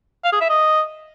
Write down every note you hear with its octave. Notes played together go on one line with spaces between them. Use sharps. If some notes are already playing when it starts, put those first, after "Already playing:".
F5
G#4
E5
D#5